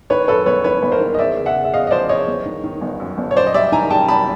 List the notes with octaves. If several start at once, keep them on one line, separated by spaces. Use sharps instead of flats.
D#3 B4 C#5
F#2 A4 B4
G1 B4 C#5
D#3 B4 C#5
G1 B4
A#4 C5
D#3
D#5
E2 D5 E5
C#3
E5 F#5
C#3
E5
E2 D#5 F5
D#5
F3 C5 D5
E2 C#5 D#5
G1
D#3
D#3
G1
F#2
G1
C#5
F#2 C5 D5
D#5
G3 D5 E5
D#3 G#5 A#5
G3 G5 A5
F#2 A5 B5